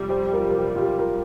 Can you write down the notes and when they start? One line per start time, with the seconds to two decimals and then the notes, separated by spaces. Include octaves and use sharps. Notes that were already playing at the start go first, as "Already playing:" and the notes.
Already playing: F2 C3 G3
0.09 G4 C5
0.33 F4 A#4
0.49 A#4
0.58 G4
0.76 F4
0.81 G4
0.99 F4 A#4